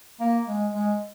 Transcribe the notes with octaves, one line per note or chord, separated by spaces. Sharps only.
A#3
G#3
G#3